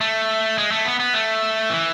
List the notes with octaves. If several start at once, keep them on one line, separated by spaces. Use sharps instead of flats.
A3
G#3
A3
B3
B3
A3
E3